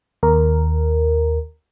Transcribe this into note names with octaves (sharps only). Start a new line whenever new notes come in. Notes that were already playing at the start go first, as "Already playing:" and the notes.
D#2 A#4